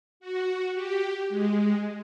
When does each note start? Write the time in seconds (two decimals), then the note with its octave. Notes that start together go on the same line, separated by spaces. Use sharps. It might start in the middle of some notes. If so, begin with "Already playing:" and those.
0.20 F#4
0.74 G4
1.29 G#3